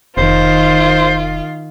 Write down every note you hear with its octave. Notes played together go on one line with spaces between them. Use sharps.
F1 D#3 F4 C5